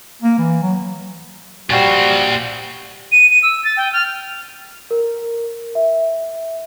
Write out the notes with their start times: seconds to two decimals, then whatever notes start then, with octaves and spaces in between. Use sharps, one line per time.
0.22 A#3
0.39 E3
0.62 F#3
1.70 A#2 G3 F#4 C5
3.12 D#7
3.30 D#7
3.43 E6
3.64 A6
3.77 G5
3.93 F6
4.91 A#4
5.75 E5